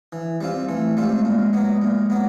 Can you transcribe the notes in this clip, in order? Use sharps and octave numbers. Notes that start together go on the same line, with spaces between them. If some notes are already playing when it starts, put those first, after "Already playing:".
E3
G3 C4 F4
E3 A3
G3 G#3 C4 F4
A#2 G#3
F#3 B3
A#2
F#3 B3